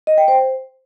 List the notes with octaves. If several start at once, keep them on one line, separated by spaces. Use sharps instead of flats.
D#5
G5
C5